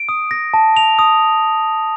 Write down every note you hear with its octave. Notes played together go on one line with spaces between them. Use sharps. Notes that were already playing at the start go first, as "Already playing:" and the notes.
Already playing: D7
D#6
A#6
A5
F7
D#6